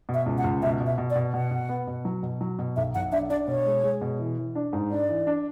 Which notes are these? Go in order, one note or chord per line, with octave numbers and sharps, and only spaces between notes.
B2
E5
C#2
F#5
C#2
B2 E5
B2
E5
B2
D5
B2
B2 F#5
B2
B3
B2
F#3
B2
F#3
B2
B1 E5
B1 F#5
D4 E5
D4 D5
B2 C#5
G#3
G#3
B2
E3
E3
D4
G#2
D4 D5
E3
D4